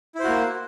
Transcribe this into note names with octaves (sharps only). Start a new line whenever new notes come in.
A#3 E4 F#4 C5